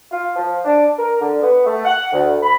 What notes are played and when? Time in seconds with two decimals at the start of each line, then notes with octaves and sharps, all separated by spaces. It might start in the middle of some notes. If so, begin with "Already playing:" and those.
0.12 F4
0.36 F3
0.64 D4
0.97 A#4
1.20 D3
1.43 B3
1.65 A3
1.85 F#5
2.12 D2
2.42 B5